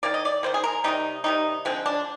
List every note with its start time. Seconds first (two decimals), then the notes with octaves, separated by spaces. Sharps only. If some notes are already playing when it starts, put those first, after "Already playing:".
0.03 D#3 A#3 D5
0.14 D#5
0.25 D5
0.43 D#3 A#3 C5
0.54 G#4
0.64 A#4
0.84 C3 D#3 G3 D#4
1.24 C3 D#3 G3 D#4
1.65 D3 F3 G#3 C4
1.86 D4